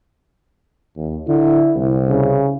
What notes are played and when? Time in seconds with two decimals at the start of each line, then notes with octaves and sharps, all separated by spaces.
0.97 D#2
1.28 D3 E4
1.76 C2
2.08 C#3